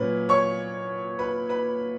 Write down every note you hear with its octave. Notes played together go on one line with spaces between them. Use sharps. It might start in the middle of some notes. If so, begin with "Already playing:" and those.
Already playing: A#2 F#3 C#4 B4
C#5 C#6
B4 B5
B4 B5